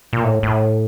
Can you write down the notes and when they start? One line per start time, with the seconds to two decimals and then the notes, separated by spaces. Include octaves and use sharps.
0.13 A#2
0.24 A2
0.43 A2